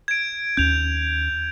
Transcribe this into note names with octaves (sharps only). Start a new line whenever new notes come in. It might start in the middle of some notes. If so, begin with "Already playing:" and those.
G#6 D7
D#2 C#4 G6 F7